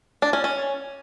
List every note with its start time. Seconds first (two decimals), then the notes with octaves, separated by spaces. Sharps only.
0.22 D4
0.33 C#4
0.44 C#4